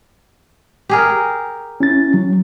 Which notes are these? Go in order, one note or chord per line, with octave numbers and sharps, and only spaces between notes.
G4 G#4 A#4
C#4 E4 A6
F#3